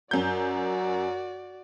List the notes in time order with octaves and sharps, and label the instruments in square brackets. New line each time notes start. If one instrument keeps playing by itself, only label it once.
[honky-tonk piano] F#2 G6 [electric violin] F#4 D5